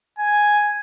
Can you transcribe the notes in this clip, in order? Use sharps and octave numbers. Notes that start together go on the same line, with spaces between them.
G#5